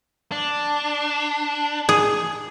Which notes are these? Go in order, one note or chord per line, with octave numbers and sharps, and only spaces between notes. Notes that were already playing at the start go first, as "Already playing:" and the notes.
D4
G#4